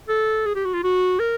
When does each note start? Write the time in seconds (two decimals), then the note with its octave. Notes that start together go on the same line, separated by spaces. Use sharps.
0.08 A4
0.46 G#4
0.55 G4
0.65 F#4
0.74 F4
0.83 F#4
1.19 A#4